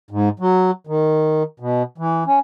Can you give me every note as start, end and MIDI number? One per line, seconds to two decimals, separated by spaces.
0.11 0.29 44
0.40 0.71 54
0.87 1.43 51
1.60 1.83 47
1.98 2.24 52
2.27 2.39 61